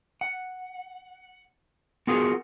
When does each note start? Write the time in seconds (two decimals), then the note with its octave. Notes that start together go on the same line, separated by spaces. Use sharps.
0.21 F#5
2.07 B3 F4 F#4 G#4 A#4